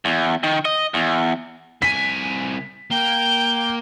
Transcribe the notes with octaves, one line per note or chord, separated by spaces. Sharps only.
E2
D#3
D#5
E2
C2 G#5 B6
A#3 G5 G7